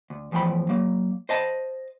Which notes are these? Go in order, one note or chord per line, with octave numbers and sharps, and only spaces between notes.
D2
E2 A2 F3 G5 B5
F#3 A#3
C5 D#5 A5